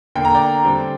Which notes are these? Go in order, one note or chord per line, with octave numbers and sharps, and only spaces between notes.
D3 A#3 D4 G5
A#5
D5 G5
D3 G3 C4